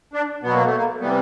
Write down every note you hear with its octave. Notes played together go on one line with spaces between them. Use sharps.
D4
B2 F#3 B3
A#3
A3
A#3
C3 E3 G3 B3